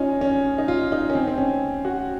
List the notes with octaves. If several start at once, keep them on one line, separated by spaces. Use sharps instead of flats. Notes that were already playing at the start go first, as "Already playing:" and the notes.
Already playing: C#4 D#4 F4
C#4
D#4
F4
D#4
C#4
C4
C4
C#4
F#4